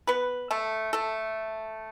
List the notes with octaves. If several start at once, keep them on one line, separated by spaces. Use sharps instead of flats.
B3 B4
A3 A4
A3 A4